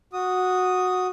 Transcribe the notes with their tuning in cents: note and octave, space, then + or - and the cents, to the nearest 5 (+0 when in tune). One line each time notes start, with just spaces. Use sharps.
F#4 -10 D#6 +0